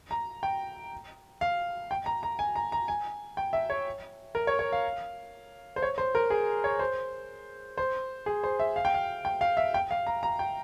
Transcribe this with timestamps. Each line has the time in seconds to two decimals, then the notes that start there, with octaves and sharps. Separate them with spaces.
0.11 A#5
0.43 G5
1.41 F5
1.91 G5
2.06 A#5
2.23 A#5
2.39 G#5
2.56 A#5
2.72 A#5
2.88 G#5
3.37 G5
3.53 E5
3.70 C#5
4.35 A#4
4.47 C#5
4.59 C#5
4.72 F5
5.76 C5
5.82 C#5
5.98 C5
6.15 A#4
6.30 G#4
6.64 C#5
6.79 C5
7.78 C5
8.26 G#4
8.44 C5
8.59 E5
8.76 F5
8.85 G5
8.94 F5
9.25 G5
9.41 F5
9.57 E5
9.74 G5
9.91 F5
10.07 A#5
10.23 A#5
10.39 G5